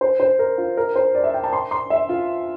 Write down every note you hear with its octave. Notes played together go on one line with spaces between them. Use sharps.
C5
C5
A#4
F4
A#4
C5
D5
E5
G5
A5
C6
C6
E5
F4